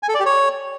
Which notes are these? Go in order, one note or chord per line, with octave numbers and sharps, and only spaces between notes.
G#5
A4
D5
G4
C#5